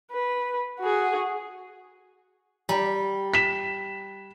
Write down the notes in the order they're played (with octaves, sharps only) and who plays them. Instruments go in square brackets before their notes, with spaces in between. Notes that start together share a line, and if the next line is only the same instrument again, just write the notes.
[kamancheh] B4
F#4 G#4
[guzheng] G3 [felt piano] A#5
[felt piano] B6 E7